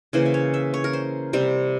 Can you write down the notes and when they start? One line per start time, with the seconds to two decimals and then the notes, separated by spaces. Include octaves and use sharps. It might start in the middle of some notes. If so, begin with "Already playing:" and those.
0.13 C#3 E3 A#3 C5
0.26 E5
0.34 C#5
0.54 E5
0.74 C#5
0.84 A#4
0.93 C5
1.33 C3 G3 C4